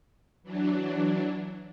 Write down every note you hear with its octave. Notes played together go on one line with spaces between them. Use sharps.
E3 F#3 D4